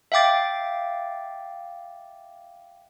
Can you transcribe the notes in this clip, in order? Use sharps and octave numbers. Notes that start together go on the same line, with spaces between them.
E5 F5 G5 D6 A6